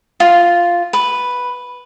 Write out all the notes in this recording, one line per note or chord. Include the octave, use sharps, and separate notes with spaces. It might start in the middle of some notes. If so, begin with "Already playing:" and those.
F4
B4